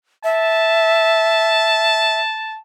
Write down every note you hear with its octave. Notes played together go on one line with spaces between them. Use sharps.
E5 A5